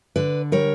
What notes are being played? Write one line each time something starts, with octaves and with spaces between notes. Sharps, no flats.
D3 B4 D5
G3 A#4 C#5